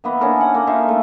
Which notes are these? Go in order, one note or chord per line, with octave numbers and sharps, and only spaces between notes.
D#3 A#3 B3 E4
C#4 D4 A4 A#4
F#5
A#3
D#4 F4 E5 F5
A3